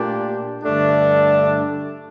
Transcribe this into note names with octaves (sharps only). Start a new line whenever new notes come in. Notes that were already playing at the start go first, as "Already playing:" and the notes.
Already playing: A#2 A3 D4 G4
G2 D3 A3 D4